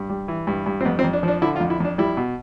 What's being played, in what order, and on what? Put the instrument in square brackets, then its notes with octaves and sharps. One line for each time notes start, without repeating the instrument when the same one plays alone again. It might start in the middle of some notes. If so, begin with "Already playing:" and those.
Already playing: [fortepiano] G2
G3
E3
G2
G2
C4
F2 B3
C4
F2
D4
F3
D4
D3 E4
F4
F2
E4
F2 D4
G3 E4
B2